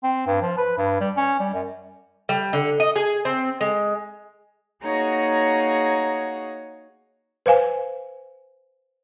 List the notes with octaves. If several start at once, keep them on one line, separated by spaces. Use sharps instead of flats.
C4
G2
F3
B4
G2
G3
C#4
G3
F#2
G3
D3
D#5
G#4
C4
G#3
A#3 D#4 F#4 G#4 C#5 A#5
B4 C5 F5 G#5